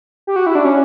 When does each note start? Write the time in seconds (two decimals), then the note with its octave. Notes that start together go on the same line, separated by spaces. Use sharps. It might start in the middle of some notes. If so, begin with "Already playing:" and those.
0.27 G4
0.36 F#4
0.46 E4
0.55 D4
0.65 C#4